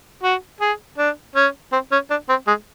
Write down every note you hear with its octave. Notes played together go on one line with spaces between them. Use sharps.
F#4
G#4
D4
C#4
C4
C#4
D4
C4
G#3